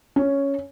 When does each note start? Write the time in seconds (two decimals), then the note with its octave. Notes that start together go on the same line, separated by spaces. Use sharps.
0.16 C#4